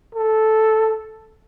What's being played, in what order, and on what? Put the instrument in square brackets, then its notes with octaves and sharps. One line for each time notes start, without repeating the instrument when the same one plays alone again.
[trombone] A4